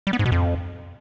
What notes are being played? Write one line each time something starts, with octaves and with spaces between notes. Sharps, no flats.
G3
B3
G#2
B2
F2